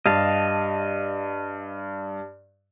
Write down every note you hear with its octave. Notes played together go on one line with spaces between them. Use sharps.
G2 D#5 F5 A5